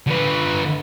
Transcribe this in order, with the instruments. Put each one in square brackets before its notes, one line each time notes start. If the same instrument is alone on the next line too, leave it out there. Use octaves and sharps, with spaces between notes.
[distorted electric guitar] D3 B4